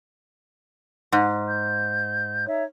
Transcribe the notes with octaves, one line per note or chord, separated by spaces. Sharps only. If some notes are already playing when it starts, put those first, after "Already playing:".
G#2
G6
D#4 C#5 E5